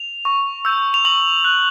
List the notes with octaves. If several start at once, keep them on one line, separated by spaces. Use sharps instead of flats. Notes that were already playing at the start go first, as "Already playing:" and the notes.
Already playing: F7
C#6
E6 G6
F7
C#6 F#7
F#6